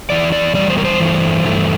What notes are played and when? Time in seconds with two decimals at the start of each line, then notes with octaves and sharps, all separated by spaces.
0.10 E2 E3 D5
0.32 D5
0.55 E2 E3 G3 D5
0.70 C5
0.78 A#4
0.85 C5
0.99 G2 E3 A3
1.44 G2 E3 A3